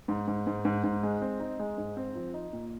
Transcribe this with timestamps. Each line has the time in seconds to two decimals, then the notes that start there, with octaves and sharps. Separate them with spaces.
0.08 G#2
0.28 G#2
0.47 G#2
0.65 G#2
0.84 G#2
1.03 G#3
1.21 C4
1.40 D#4
1.59 G#3
1.78 G#2
1.97 C4
2.15 F3
2.34 D#4
2.53 A#2